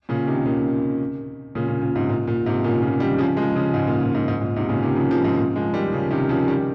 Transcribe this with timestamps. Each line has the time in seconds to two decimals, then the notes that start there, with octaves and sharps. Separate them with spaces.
0.09 A#2 C#3
0.26 C3 D#3
0.46 A#2 C#3
1.55 A#2 C#3
1.68 A#2
1.82 A#2
1.95 G#2 C3
2.09 A#2
2.28 A#2
2.46 G#2 C3
2.64 A#2 C#3
2.82 A#2 C#3
3.00 D#3 G3
3.18 C#3 F3
3.37 F3 G#3
3.55 C#3 F3
3.74 G#2
3.87 A#2
4.01 A#2
4.15 G#2
4.28 G#2
4.41 A#2
4.56 G#2 C3
4.69 A#2 C#3
4.82 C3 D#3
4.96 C#3 F3
5.11 C#3 F3
5.24 G#2
5.37 A#2
5.56 F3 G#3
5.74 D#3 G3
5.92 C#3 F3
6.11 C3 D#3
6.29 C#3 F3
6.48 D#3 G3